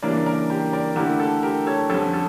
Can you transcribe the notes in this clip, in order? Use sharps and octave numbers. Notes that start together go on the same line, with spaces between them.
C#3 E3 G3 A#3 D4 A#4 D5
A#4 D5
G4 A#4
A#4 D5
D3 A3 E4 G4 A#4
A4
G4 A#4
A4 C#5
F2 D3 G3 C#4 A4
A4